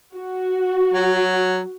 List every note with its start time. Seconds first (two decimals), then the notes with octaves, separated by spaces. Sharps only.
0.13 F#4
0.94 F#3